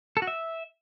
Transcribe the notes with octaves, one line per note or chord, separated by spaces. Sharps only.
A4
F#4
E5